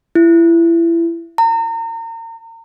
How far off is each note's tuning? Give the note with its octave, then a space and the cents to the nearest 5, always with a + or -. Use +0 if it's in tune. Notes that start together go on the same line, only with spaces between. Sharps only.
E4 +25
A#5 -35